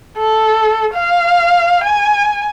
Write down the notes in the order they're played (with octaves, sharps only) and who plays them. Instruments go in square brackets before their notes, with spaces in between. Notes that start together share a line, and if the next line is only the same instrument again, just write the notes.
[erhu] A4
F5
G#5